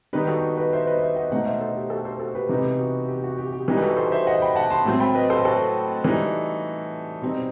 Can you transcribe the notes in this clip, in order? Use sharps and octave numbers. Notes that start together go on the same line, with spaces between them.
D#3 G3 B3 D#4 G4 B4
F#4 A4
B4 D#5
C5 E5
B4 D#5
D#5
C5 E5
D#5 F#5
B2 A3 D#4 D#5 F#5
C5 E5
A4 C5
G4
F#4 A4
A4 C5
F#4 A4
G4 B4
C3 E3 B3 D#4 G4
F#4
G4
F#4
G4
G4
E3 G3 D#4 G4
B4
F#4 A4
A4 C5
C5 E5
D#5 F#5
G5 B5
F#5 A5
A5 C6
A2 F#3 A3 C4
G5 B5
B4 D#5
A4 C5
F#4 A4
E3 G3 D#4
B2 G3 C4 D#4